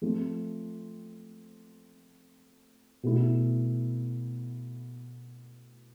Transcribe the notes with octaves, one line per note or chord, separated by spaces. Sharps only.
F3 A3 C4
B2 A3 E4